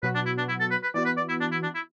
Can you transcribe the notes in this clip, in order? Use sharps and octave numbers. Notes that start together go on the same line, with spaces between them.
B2 F#3 B3 F#4 B4
D4
E4
D4
E4
A4
B4
B4
E3 B3 F#4 D5
B4
D5
E4
D4
E4
D4
E4